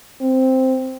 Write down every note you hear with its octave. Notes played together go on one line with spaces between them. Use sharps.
C4